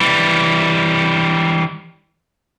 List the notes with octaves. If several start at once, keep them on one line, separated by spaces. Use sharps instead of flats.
E3 G3